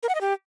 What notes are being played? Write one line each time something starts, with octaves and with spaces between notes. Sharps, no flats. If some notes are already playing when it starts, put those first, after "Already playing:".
A#4
F#5
D#5
G4